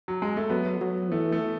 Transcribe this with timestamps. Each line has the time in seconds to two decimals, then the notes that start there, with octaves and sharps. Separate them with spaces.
0.08 F#3
0.22 G#3
0.37 A3
0.50 F#3 B3
0.81 F#3
1.11 E3 A3
1.32 A3